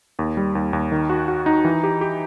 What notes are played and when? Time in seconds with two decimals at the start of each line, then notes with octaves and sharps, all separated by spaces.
0.19 D#2
0.37 G3
0.55 D#2
0.73 D#2
0.92 D#3
1.10 F#4
1.28 F#4
1.46 D#4
1.65 E3
1.84 G4
2.01 G4